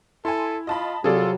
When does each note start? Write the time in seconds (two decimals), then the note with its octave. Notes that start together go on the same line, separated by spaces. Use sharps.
0.25 E4 A4 G#5 C6
0.67 F4 D#5 A5 B5
1.04 C3 F#3 G3 F4 G#4 A4 D5